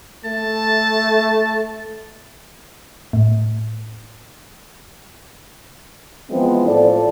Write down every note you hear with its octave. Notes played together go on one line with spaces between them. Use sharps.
A3 A5
A2
E3 F3 G#3 B3 C4
A2 F3 A4 D5